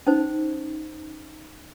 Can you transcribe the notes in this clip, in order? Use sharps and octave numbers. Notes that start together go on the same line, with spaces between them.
C#4 D#4 C5